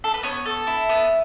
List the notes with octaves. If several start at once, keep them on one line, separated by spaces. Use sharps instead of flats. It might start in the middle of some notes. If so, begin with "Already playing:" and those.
A4
B4
B3 C#5
A4
E4
B3